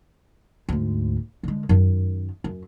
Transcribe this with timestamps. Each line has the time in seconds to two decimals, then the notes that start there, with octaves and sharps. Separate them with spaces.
0.69 D2 G#2
1.43 D3 G#3
1.69 F#2 D#3
2.44 F#2